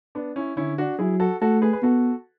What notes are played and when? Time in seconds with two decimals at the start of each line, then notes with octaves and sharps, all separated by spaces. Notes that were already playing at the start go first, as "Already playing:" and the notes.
0.15 B3 D4
0.36 C#4 E4
0.57 D3 C#4 E4
0.78 D4 F#4
0.99 F#3 E4 G#4
1.20 F#4 A4
1.42 A3 F#4 A4
1.62 G#4 B4
1.73 B4
1.83 B3 F#4 A4